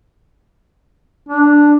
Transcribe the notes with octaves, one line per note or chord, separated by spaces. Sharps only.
D4